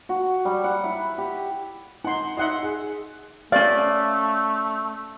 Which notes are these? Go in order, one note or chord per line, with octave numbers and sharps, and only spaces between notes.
F#4
G3
F#5
E4
G4
D#4 F#5 C6
D#4 E5 F#5 C6
G#4
A3 C#4 D5 F5